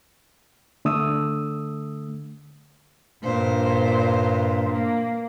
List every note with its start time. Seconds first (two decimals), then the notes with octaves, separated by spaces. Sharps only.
0.85 D3 A3 D#6 E6
3.23 G2 A#2 C5
4.70 A#3